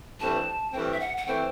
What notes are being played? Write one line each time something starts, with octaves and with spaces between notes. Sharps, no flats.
G2 E3 A3 C4 A5
G2 E3 A3 C4 G5
E5
F#5
F#5
E3 A3 C4 G5